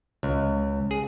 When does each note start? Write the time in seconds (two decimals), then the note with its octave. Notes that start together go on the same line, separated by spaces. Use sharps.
0.23 C#2
0.91 G#4